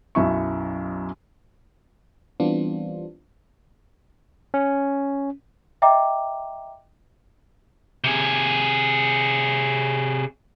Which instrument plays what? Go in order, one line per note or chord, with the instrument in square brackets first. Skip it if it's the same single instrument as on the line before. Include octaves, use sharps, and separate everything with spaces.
[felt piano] B1 F#2 E4 C#6
[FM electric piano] E3 G3 B3 C4 D4 F4
[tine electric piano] C#4
[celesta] D#5 E5 G5 A#5 D6
[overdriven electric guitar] C3 G#4